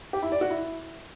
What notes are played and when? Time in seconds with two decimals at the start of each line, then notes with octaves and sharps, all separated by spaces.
0.13 G4
0.23 E4
0.32 D5
0.41 F#4
0.50 E4